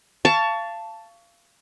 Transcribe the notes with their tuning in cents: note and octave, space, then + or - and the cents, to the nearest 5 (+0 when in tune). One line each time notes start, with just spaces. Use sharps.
F5 -25 A5 +5 C#6 +25